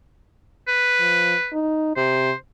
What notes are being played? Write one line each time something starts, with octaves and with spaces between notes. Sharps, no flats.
B4
F3
D#4
C3 C5